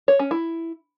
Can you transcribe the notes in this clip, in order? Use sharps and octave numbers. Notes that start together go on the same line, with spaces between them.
C#5
C#4
E4